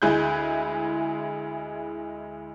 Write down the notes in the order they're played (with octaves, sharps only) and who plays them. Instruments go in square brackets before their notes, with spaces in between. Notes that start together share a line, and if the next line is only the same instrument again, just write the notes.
[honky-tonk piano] D2 G#3 E4 G#4 F#6 G6